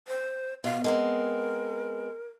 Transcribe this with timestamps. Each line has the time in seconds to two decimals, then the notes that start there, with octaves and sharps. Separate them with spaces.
0.08 C5
0.64 B2 F5
0.84 G#3 B3 C4 A#4